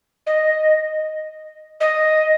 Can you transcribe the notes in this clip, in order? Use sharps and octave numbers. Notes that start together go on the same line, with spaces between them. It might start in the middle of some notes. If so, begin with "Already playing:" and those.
D#5
D#5